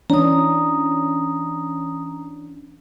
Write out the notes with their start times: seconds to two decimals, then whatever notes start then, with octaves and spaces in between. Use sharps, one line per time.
0.10 E3 C#4 D4 A#5 D#6